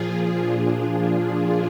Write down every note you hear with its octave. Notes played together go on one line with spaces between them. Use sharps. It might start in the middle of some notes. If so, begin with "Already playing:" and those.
Already playing: A#2 F3 F4 G#4
D4 F4
D4 F4